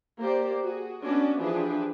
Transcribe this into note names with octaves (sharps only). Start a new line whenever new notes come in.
A#3 G4 C5 D5
F#4 G#4
B3 C#4 D4 F#4 B4 D5
E3 F3 D4 G4 G#4 B4